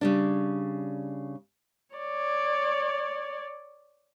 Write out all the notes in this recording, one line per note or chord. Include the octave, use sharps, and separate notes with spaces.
C#3 G3 D4
C#5 D5